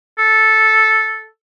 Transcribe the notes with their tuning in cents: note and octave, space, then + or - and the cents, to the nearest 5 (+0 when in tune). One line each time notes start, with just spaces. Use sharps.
A4 -5